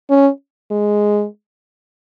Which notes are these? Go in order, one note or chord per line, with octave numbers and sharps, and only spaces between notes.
C#4
G#3